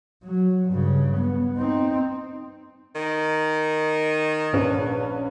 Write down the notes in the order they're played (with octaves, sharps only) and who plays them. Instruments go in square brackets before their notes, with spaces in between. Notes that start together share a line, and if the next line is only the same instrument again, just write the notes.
[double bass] F#3
G2 C#3
B3
C4 D#4
[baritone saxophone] D#3
[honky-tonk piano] A#1 C#4 B4